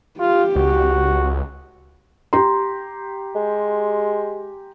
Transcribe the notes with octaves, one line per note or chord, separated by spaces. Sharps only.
F4 G4
C#2 F#4
G4 A#5 C6
G#3